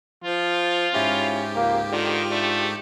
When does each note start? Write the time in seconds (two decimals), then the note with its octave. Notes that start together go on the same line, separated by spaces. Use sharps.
0.24 F3 F4
0.94 G#2 C#4 E4 G4
1.56 C#2 A#3
1.92 D3 D#3 F4
2.31 A3 D4